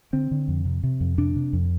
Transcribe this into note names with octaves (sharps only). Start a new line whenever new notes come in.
D3 C4
D3
F2
C3
C3
F2
C3 D4
C3
F2